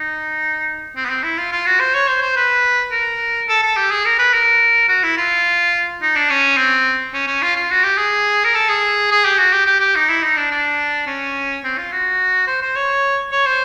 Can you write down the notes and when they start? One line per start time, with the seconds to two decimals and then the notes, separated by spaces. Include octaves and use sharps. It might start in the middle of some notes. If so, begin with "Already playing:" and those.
Already playing: D#4
0.96 C4
1.05 B3
1.10 C4
1.23 E4
1.38 F4
1.52 F4
1.66 F#4
1.80 C5
1.94 C#5
2.08 C5
2.21 C5
2.36 B4
2.92 A#4
3.48 A4
3.63 A4
3.77 G4
3.91 G#4
4.05 A#4
4.19 B4
4.33 A#4
4.88 F#4
5.03 E4
5.18 F4
6.02 D#4
6.16 D4
6.30 C#4
6.57 C4
7.14 C#4
7.27 C#4
7.42 F4
7.56 F4
7.71 F#4
7.83 G4
7.98 G#4
8.44 A#4
8.55 A4
8.69 G#4
9.11 G#4
9.25 G4
9.38 F#4
9.52 G4
9.66 G4
9.80 G4
9.95 D#4
10.09 E4
10.23 D#4
10.37 D4
10.51 D4
11.07 C#4
11.64 C4
11.78 F4
11.92 F#4
12.47 C5
12.62 C5
12.76 C#5
13.32 C#5
13.46 C5